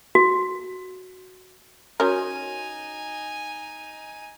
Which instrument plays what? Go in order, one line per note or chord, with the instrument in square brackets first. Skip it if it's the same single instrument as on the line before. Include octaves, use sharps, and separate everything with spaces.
[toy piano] F#4
[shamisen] C#4 A#4 [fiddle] D#4 G#5 [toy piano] F#4 C#5 D#6